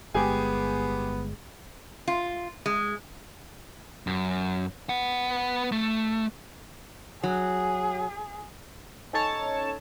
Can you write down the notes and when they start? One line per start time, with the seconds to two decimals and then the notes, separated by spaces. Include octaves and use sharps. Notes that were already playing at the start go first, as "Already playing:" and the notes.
0.14 G1 G#3 B3 G4 G#4 G#5
2.08 F4
2.66 G#3
4.07 F#2
4.89 B3 F#5
5.72 A3
7.23 F#3 G#4
9.13 C#4 D#4 A4 C#5 A5